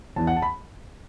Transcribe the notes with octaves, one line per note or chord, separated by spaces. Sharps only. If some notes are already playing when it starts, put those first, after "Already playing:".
E2 E3 A5
F#5
A5
B5